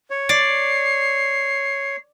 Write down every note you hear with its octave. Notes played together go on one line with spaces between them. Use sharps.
C#5
D5 C7